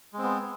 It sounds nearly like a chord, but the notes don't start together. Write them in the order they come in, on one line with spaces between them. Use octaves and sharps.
G#3 C4 B3